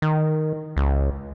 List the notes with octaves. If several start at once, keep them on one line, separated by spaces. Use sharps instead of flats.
D#3
C#2